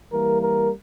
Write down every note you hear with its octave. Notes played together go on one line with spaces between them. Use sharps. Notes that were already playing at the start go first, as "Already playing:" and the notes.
E3 G3 A#3 A#4
A#4